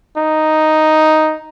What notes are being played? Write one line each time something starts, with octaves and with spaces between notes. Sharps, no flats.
D#4